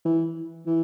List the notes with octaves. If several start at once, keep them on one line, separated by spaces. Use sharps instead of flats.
E3
E3